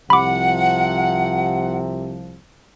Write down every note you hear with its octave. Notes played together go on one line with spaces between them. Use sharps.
C2 C3 F3 F#5 B5 D6